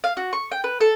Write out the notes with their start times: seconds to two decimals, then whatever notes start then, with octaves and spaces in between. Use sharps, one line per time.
0.04 F5
0.17 F#4
0.33 C#6
0.52 G5
0.64 B4
0.80 A4